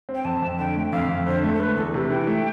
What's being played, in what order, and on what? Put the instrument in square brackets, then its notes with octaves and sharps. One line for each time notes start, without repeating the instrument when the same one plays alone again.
[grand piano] C4
[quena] G5
[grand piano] F2 [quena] A5
[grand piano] F2
[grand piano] D3 [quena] G5
[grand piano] A3
[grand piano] F2 [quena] F5
[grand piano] F2
[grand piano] D3 [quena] C5
[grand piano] A3 [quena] A4
[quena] A4
[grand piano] A3 [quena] B4
[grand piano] E2 [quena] A4
[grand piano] C3 [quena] B4
[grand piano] E3 [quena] G5
[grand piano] A3